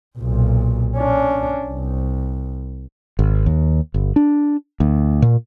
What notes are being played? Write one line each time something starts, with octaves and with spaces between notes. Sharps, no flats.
B1 A#2
C#4 D4
C2
G#1
D#2
G1
D4
D2
A#2